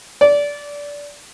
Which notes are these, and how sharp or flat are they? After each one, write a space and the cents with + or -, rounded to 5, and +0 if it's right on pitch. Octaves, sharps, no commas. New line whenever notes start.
D5 -20